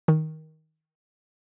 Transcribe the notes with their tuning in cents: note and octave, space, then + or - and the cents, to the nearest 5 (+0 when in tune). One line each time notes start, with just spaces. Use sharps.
D#3 +15